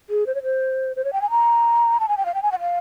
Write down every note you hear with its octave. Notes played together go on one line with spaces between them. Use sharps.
G#4
C5
C#5
C5
C5
C#5
G5
G#5
A#5
A5
G#5
G5
F5
G5
G#5
F#5
F5